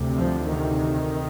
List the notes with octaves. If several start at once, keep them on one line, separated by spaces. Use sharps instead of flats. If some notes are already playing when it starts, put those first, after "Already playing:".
Already playing: D2 C3
F3
D#3